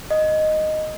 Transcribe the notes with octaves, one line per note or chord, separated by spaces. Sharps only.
D#5